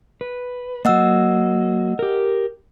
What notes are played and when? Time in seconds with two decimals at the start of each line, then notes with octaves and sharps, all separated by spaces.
0.21 B4
0.85 F#3 A#3 D#5 F#5 E6
1.99 G4 A#4